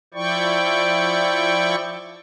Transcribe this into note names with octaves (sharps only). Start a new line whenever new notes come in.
F3 E4 D5 G5 C#6